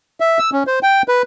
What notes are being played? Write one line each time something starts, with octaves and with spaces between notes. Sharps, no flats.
E5
E6
C#4
C5
G5
B4